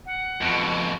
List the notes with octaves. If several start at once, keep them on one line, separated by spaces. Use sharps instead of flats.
F#5
F2 B2